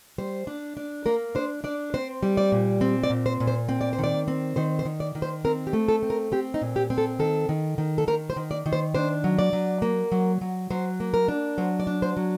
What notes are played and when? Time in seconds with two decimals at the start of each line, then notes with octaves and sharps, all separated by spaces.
0.18 G3 C5
0.47 D4
0.77 D4
1.06 A#3 A#4
1.35 D4 C5
1.64 D4 D5
1.94 C4 C5
2.23 G3
2.37 D5
2.52 A#2
2.81 C4
3.03 D5
3.10 A#2
3.26 C5
3.40 A#2
3.47 C5
3.69 C4
3.81 D5
3.93 C5
3.99 D#3
4.04 D5
4.28 C4
4.56 D#3 C5
4.79 C5
4.85 D#3
5.00 D5
5.15 D#3
5.22 C5
5.45 C4 A#4
5.67 G4
5.73 A3
5.88 A4
6.03 C4
6.10 A#4
6.32 C4 G4
6.54 D#4
6.61 A#2
6.76 G4
6.90 C4
6.98 A4
7.19 D#3 A4
7.49 D#3
7.78 D#3
7.98 A4
8.08 D#3 A#4
8.30 C5
8.36 D#3
8.51 D5
8.66 D#3
8.73 C5
8.95 D4 C5
9.24 F#3
9.39 D5
9.53 F#3
9.82 A#3
10.12 F#3
10.41 F#3
10.70 F#3 C5
11.00 A#3
11.14 A#4
11.28 D4
11.58 F#3 C5
11.80 D5
11.87 D4
12.02 C5
12.17 F#3